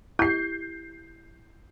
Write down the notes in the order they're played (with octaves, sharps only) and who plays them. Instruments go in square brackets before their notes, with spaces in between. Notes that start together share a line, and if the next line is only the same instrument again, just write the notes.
[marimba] E4 G4 [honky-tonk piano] G6 C7